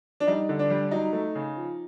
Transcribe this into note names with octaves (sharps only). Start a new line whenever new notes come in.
D4
G3 D#4
D3
D4
G3
F#3 D#4
A3
C#3
F3